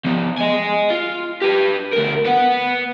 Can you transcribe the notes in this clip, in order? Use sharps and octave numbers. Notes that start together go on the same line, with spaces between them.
F3 B3
D#5 G#5
F4
G4 B4
D2 A#4
B3 F#5